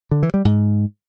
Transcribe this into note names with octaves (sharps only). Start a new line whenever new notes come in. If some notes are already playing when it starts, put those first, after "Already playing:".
D3
E3
G3
G#2